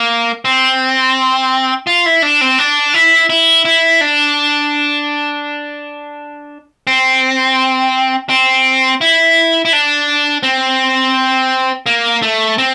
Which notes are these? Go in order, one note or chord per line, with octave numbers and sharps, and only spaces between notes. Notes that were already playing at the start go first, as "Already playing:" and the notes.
Already playing: A#3
C4
F4
E4
D4
C4
D4
E4
E4
E4
D4
C4
C4
E4
E4
D4
C4
A#3
A3
C4